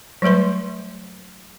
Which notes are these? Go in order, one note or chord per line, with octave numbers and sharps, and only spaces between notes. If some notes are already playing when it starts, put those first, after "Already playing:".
F#3 G3 A3 B4 C6